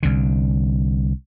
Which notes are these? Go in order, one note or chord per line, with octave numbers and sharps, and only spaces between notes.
C2 D3